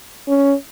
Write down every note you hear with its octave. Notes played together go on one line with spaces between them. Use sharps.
C#4